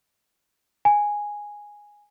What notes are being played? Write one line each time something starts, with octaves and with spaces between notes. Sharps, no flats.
G#5